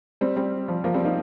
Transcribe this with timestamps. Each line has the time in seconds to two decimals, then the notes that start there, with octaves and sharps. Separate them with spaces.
0.21 G3 C4
0.36 G3 C4
0.68 F3
0.84 F3 A#3
0.94 G3 C4
1.05 A#3 D#4